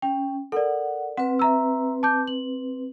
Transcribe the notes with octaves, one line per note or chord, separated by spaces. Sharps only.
C#4 G5
A4 A#4 D5 F#5
C4 B4 F#5
E5 A#5 E6
A5 D6 G6
F#7